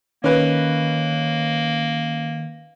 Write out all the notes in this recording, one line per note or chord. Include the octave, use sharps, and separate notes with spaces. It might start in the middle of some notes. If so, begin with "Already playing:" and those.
D#3 A#3 C#4 B4 D#5